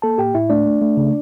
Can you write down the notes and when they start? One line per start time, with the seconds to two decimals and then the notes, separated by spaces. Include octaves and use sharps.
0.02 A#3 A4 A5
0.18 A2 G4 G5
0.35 A2 E4 E5
0.50 A3 D4 D5
0.66 A3
0.82 A3
0.97 C#3